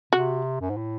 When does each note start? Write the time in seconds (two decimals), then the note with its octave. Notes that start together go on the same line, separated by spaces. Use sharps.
0.12 C3 F#4
0.61 F#2
0.70 G#2
0.77 A2